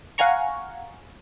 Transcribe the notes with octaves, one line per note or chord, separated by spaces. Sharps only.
F5 F#5 G#5 A#5 C#6